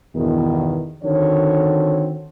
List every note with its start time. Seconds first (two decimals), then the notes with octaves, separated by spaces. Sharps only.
0.16 E2 G2 B2 D#3
1.03 D3 D#3 C4 F#4 A4 C#5